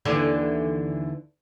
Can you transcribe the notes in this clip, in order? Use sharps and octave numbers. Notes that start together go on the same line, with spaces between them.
D#2 D3 E3